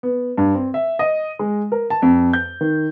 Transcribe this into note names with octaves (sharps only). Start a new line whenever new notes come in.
B3
G2
C4
E5
D#5
G#3
A#4
A5
F2
G6
D#3